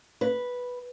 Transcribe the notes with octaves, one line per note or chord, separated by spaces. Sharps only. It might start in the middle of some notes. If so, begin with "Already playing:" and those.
B4